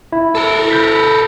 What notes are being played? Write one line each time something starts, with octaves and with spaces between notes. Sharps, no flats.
E4
A4 A#4
B5 G6 B6